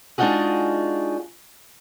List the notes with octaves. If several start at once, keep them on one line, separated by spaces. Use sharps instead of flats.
G#3 D4 D#4 F4 F#4 G#4